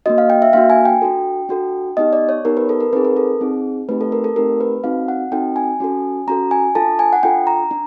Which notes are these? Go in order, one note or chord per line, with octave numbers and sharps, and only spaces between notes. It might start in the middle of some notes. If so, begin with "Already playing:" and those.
A#3 D4 F#4 D#5
F5
G5
E5
A#3 D4 F#4 F5
G#5
G5
D4 F#4 A4
D4 F#4 A4
B3 D#4 G4 D#5
D5
C#5
B3 D#4 G4 A#4
B4
A4
A#4
C4 D#4 G#4 B4
A#4
A4
C4 D#4 G#4
A3 C4 D#4 G4 B4
A4
A#4
A4
A3 C4 D#4 G4 A#4
B4
C4 D#4 F#4 A4 F5
F#5
C4 D#4 F#4 A4 G5
G#5
C#4 F#4 A4
C#4 F#4 A4 A#5
G#5
D4 F4 A4 A5
G#5
F#5
D4 F4 A4 G5
A#5
D4